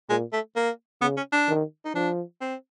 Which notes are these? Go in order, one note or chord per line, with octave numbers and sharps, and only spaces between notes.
A#2 G#3
A3
A#3
C#3 B3
C#4
D4
D#3
D#4
F3 D4
C4